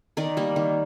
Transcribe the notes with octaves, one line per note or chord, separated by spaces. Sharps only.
D#3 A#4 D5
G3 A#3
D#3